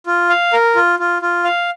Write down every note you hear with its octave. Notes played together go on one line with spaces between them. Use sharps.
F4
F5
A#4
F4
F4
F4
F5